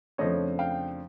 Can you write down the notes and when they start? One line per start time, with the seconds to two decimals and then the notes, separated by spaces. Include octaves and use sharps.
0.18 F2 C#3 F3 A3 D4 C#5 D#5
0.59 F5 G5